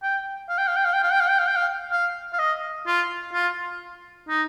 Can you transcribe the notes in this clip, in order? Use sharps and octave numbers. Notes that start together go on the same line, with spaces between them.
G5
F5
G5
F5
G5
F5
G5
F5
G5
F5
G5
F5
G5
F5
F5
F5
D#5
F4
F4
D#4